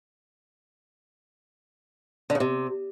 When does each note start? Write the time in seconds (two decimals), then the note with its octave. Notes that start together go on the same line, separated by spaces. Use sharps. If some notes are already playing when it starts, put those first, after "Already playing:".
2.30 D3
2.35 C#3
2.40 C3